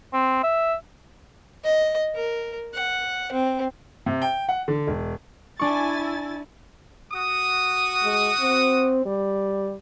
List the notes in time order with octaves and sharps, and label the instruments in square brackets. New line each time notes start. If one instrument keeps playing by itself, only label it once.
[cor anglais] C4
E5
[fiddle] D#5
A#4
F#5
C4
[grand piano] C3
G5
F#5
D3
E1
[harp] D4 C#6 [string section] E4 G#5 A6
[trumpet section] F#4 D#6
[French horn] G#3
C4
G3